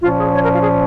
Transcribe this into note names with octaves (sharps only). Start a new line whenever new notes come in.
A#2 F3 C#4 F4
G#4
C#5
A#4
F4
G#4